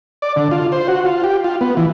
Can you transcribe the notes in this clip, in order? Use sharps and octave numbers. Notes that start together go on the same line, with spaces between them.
D5
D3
F4
C5
F#4
F4
G4
F4
B3
E3